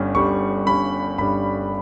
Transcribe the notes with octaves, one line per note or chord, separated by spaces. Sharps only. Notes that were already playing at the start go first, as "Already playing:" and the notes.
Already playing: G1 G2 G3 C#4
G1 G2 G3 C#4 C#6
G1 G2 G3 C#4 B5
G1 G2 G3 C#4 B5